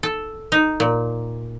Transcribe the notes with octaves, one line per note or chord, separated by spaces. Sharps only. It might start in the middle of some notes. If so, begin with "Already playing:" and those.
A4
D#4
A#2